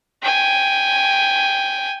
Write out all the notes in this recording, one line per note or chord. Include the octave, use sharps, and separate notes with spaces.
G5 G#5